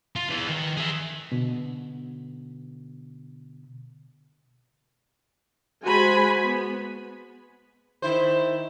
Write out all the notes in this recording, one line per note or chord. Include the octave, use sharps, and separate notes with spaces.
F4
E2 E3
D#3
G#4 E5
B2 D3
G#3 F#4 C5 G#5 B5
B3
D#3 E4 C5